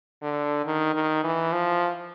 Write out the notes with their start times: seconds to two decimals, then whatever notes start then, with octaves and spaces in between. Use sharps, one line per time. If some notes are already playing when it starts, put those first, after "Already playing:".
0.22 D3
0.66 D#3
0.94 D#3
1.24 E3
1.53 F3